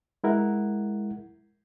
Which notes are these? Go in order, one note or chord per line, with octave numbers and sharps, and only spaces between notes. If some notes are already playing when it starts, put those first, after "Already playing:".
G#3 E4 A#4 F#5